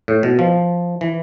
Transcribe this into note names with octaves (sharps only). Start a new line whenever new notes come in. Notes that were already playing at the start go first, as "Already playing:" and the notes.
A2
B2
F3
E3